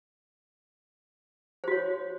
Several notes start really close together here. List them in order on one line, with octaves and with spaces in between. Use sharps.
C5 F#4 C#5